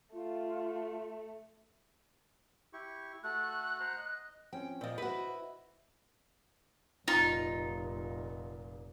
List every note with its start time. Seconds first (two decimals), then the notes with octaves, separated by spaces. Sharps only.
0.14 A3 F4
2.73 E4 G4 C#6
3.24 A3 F#4 A4 F#6
3.80 C5 F#5 A#5
3.97 D#5
4.53 F3 C4 C#4 G5
4.81 A#2 F3 C5 D#5
4.98 E4 F#4 B4
7.08 F1 A#2 D#4 F4